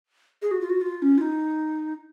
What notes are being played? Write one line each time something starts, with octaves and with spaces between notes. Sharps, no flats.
G#4
F#4
F4
F#4
F4
C#4
F4
D#4